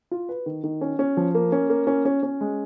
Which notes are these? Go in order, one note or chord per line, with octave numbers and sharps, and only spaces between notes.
F4
B4
D#3
D#3
C#4
C#4
F3
A#3
C#4
A#3
C#4
C#4
C#4
G#3